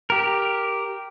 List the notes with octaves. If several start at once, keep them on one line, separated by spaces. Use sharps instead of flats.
G4 A#4